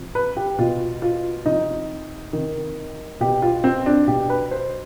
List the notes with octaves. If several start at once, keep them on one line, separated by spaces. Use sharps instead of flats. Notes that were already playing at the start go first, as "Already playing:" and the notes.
Already playing: C3 F3
B4
G4
B2 F4
F4
C3 F3 D#4
C3 D#3
B2 G4
F4
C4
D4
B2 G4
B4
C5